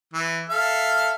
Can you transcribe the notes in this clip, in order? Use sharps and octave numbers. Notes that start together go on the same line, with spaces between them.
E3
A4 E5 F5